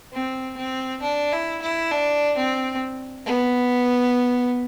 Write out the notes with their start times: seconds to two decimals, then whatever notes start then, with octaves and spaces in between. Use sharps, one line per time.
0.13 C4
0.57 C4
1.02 D4
1.32 E4
1.62 E4
1.92 D4
2.37 C4
3.26 B3